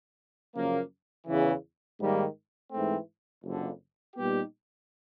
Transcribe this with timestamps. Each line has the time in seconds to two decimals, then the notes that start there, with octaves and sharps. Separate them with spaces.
0.54 F#2 C#3 F3 A#3
1.27 E2 C#3 E3
1.99 G#2 D#3 G3 A#3
2.71 G#2 E3 A3 C4
3.43 F#1 F2 D3
4.15 A#2 G3 B3 D#4 G4